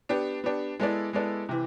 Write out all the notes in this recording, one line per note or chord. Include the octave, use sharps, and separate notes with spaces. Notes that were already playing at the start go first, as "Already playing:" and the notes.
B3 D4 G4
B3 D4 G4
G#3 B3 E4 A4 D5
G#3 B3 E4 A4 D5
C3 E3